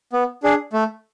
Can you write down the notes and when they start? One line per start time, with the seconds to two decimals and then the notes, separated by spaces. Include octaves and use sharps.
0.13 B3
0.43 D4 G#4
0.73 A3